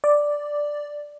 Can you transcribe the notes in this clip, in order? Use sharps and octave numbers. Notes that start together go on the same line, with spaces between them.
D5